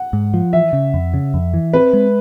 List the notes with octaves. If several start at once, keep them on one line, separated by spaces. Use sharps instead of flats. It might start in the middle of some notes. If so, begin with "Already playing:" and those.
Already playing: F#5
G#2
F3
E3 E5
C#3
F2
C#3
F2
E3
C4 B4
G#3